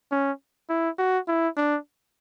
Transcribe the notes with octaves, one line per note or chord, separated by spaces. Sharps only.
C#4
E4
F#4
E4
D4